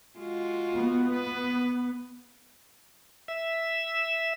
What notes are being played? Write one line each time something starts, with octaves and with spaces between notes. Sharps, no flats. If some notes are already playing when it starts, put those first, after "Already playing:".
G#3 F4 F#4
B3
B4
E5